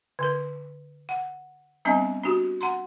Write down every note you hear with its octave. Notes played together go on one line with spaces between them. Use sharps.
D3 A#4
F#5
G3 B3 C4 D4 D#5
D4 F#4 G4
F#5 A#5 C6